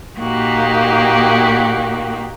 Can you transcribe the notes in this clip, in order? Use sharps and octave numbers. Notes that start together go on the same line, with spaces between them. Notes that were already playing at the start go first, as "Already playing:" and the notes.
A#2 A#3 D#4 F#4 G4